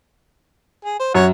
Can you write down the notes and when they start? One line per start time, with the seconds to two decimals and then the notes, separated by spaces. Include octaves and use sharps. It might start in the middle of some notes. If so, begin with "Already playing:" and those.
0.85 G#4
0.99 C5
1.15 F#2 C#5 F#5